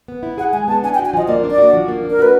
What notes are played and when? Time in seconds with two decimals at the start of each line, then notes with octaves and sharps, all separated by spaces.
0.08 B3
0.23 E4
0.38 G#4 F#5
0.53 G#3 G#5
0.68 B3 A5
0.83 D4 G#5
0.94 G5
0.99 F#4
1.06 G#5
1.13 F3 D#5
1.28 A#3 D5
1.44 D4
1.51 D5
1.58 F#4
1.73 F3
1.88 A#3
2.03 D4
2.11 A#4
2.19 F#4 B4